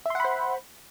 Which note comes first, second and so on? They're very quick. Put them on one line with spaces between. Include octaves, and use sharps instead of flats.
E5 C6 F#5 B5 C5